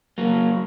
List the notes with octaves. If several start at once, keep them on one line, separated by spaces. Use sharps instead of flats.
F#3 A#3